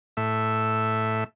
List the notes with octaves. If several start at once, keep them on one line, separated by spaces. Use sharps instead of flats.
A2 E5